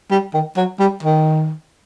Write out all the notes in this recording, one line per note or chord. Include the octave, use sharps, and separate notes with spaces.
G3
D#3
F#3
G3
D#3